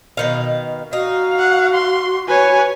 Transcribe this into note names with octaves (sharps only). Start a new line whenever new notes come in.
B2 D#3 F5
D#4 F#4 F5
F#5
C6
B4 C#5 G#5